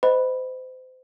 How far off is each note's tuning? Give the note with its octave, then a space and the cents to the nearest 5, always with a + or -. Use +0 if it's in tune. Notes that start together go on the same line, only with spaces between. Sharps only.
C5 -35 D#5 +0 B5 +0